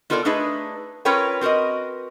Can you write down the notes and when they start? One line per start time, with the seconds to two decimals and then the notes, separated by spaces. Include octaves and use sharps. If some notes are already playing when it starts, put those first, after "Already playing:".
0.10 B3 F4 A4 A#4 C5 D5
0.25 A3 D4 D#4 G#4 B4
1.05 C#4 F4 A#4 B4 C#5 G5
1.41 C4 F#4 A#4 B4 D#5